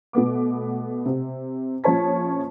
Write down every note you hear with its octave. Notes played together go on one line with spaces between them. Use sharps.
B2 A3 B3 D6
C3
A#1 F3 C#4 C#5 A5 B6